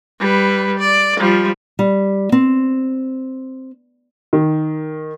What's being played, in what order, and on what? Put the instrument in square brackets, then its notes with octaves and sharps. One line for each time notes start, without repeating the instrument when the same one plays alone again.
[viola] G3 B4
D5
F3 G3
[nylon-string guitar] G3
C4
[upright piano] D#3